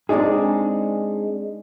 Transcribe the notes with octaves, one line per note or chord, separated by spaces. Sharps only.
G#3 C4 D4 D#4 G#4